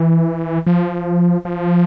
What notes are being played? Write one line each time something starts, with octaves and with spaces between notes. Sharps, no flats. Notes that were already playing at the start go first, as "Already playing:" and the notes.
Already playing: E3
F3
F3